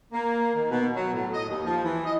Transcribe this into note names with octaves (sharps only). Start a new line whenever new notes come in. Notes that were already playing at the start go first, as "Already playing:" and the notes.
A#3
D#3
B2
F#3
A2
D#5
D#2
F3
E3
D#5